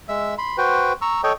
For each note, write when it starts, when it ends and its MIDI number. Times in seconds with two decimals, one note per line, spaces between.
0.09 0.34 56
0.09 0.34 76
0.09 0.34 88
0.38 0.57 83
0.38 0.57 84
0.58 0.93 66
0.58 0.93 71
0.58 0.93 72
0.58 0.93 79
1.02 1.21 82
1.02 1.21 85
1.02 1.21 88
1.23 1.32 69
1.23 1.32 73
1.23 1.32 75
1.23 1.32 79